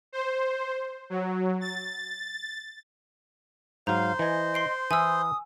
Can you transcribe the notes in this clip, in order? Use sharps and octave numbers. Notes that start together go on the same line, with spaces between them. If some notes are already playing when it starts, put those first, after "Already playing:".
C5
F#3
A6
G#2 F#3 C5 F5 A#5
E3 D#5 G#5
C6 C7 D7
E3 E4 B4 G#5 D#6 E6